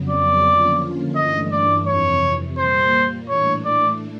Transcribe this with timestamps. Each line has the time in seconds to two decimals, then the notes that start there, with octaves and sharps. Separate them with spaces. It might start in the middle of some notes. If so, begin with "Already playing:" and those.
Already playing: F2 C#3 F#3 B3
0.09 D5
0.44 D3 F3 A#3 C#4 F4
1.15 G2 E3 A3 D4 D#5
1.51 D5
1.87 F2 C3 E3 C#5
2.58 A#2 G3 A#3 C5
3.29 A2 E3 A3 D4 C#5
3.65 D5